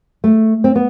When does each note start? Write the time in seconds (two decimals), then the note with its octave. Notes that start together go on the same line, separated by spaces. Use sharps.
0.24 A3
0.64 C4
0.76 B3